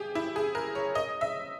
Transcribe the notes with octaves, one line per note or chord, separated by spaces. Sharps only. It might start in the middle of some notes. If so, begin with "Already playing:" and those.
Already playing: G4 G#4
E4
G#4
A#4
C#5
D#5
E5